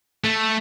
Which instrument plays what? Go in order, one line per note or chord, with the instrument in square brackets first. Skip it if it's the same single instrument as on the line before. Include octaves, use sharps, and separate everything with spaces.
[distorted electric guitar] A3